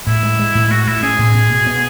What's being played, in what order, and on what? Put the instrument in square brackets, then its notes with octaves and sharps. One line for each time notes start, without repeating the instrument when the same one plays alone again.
[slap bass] A2 [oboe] E4
[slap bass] G#3
G#3
A2
[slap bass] G#3 [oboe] F#4
[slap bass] A2 [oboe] E4
[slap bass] C#4 [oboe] G#4
[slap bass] A2
B2
B2
B3